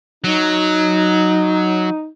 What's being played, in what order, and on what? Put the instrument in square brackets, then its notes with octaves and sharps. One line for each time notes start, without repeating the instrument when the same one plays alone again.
[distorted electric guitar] F#3 [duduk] D#4